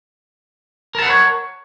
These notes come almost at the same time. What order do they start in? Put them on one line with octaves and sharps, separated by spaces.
A#4 A5 F#5 B4 C#5